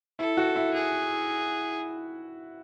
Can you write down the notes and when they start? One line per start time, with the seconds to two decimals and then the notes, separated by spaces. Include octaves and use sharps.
0.19 E4 A4
0.37 F#4
0.56 E4
0.74 G#4